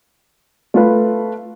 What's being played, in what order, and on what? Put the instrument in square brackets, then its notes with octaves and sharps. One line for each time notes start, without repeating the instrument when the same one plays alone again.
[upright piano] A3 F4 B4